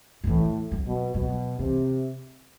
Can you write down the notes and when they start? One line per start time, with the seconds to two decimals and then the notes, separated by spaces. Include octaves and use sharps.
0.24 D3
0.27 A2 E3
0.72 F#3
0.86 B2
1.15 B2 F#3
1.59 C3 E3